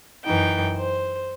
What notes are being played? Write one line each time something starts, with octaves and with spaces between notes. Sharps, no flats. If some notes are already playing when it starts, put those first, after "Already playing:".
F#2 E3 D#4 G5
C5